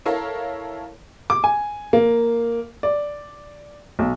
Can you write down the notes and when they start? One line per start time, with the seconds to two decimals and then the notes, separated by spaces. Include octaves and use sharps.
0.05 E4 A4 A#4 C#5 F5
1.30 D6
1.44 G#5
1.93 A#3
2.83 D5
3.99 B1